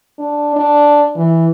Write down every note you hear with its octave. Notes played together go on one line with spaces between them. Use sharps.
D4
D4
E3